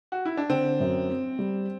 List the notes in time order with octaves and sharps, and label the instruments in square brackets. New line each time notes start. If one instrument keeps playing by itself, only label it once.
[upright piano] F#4
E4
D4
[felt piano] D3 [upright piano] C4
[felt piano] F#2
C4
G3